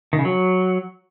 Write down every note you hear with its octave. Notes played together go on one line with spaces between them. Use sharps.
D#3
C#3
F#3